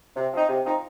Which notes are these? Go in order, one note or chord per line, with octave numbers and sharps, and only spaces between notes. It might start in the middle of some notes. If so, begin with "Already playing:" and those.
C3
F3 C4 D#4
C3
F3 C4 D#4